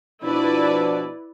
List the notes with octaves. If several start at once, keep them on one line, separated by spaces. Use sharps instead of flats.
B2 F3 D4 E4 B4 D5